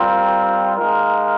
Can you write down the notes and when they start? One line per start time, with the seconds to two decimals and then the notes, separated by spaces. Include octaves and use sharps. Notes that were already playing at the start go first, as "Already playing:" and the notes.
Already playing: G3 C4 F4 A#4
0.77 G#3 D#4 A#4 F5